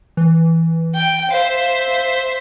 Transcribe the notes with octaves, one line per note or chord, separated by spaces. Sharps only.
E3
G5
C5 E5 F5